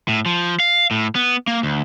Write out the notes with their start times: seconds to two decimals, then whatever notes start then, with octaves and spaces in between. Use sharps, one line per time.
0.08 A2
0.26 F3
0.60 F5
0.91 A2
1.15 B3
1.47 A#3
1.63 D2